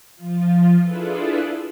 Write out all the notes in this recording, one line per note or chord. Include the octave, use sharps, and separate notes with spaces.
F3 F4
D4 E4 F4 G#4 A4 B4